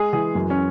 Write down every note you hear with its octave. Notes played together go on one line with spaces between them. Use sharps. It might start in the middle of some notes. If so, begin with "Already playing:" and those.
Already playing: G#3 G#4
E3 G#4
F#2
C#4